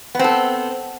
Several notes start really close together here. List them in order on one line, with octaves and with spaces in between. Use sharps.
B3 C4 A4